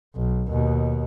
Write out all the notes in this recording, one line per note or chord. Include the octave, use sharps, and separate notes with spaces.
B1
D#2 B2